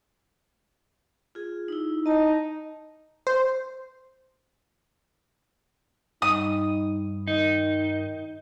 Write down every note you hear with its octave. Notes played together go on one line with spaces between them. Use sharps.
F4 G#4
D#4 E4
D#4 D#5 A5
C5
G2 G3 D#4 G5 D#6
D#3 D#4